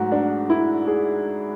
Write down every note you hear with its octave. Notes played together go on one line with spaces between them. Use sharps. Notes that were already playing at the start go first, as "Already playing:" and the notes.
Already playing: G#2 F#3 A3 F#4
D4
E4
G#4